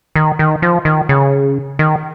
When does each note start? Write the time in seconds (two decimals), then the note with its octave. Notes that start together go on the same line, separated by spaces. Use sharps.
0.16 D#3
0.39 D#3
0.62 F3
0.85 D#3
1.09 C#3
1.79 D#3